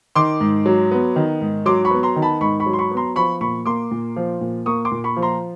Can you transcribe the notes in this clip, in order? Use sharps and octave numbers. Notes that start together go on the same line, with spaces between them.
D#3 C6 D6
G#2
F#3
B3
D#3
G#2
F#3 C6 D6
B5 C#6
B3
A#5 C6
D#3
A5 B5
G#2 B5 C#6
B5 C#6
F#3
C6
B5 C#6
B3
A#5 C6
F3 B5 C#6
A#2 B5 C#6
A#3 C6 D6
A#2
F3
A#2
A#3 C#6 D#6
C6 D6
A#2
B5 C#6
F3
A#5 C6